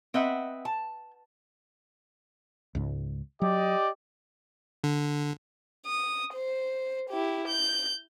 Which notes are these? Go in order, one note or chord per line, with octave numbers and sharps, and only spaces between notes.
C4 B4 D#5 E5 F#5
A5
C#2 G#2
F#3 G4 D5 D#5
D3
D#6
C5
E4 G4
G6